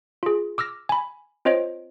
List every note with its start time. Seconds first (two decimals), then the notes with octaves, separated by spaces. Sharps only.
0.23 F4 G#4
0.58 D6 E6 F6 A#6
0.89 G#5 B5
1.45 C4 F4 C5 C#5 D#5 D7